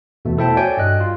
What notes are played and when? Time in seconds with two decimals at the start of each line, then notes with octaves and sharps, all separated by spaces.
0.25 E2 B2 A3
0.38 E4 A4 C5 E5 G5 A5
0.57 F#4 C#5 D5 G5 G#5
0.77 G2 D#5 F#6
1.00 F4